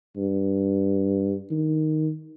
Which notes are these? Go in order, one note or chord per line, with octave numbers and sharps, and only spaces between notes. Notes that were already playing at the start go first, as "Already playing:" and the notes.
G2
D#3